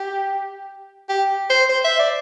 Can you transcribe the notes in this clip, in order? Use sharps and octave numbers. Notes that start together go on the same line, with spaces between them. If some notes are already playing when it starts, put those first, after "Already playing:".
Already playing: G4
G4
C5
C5
E5
D5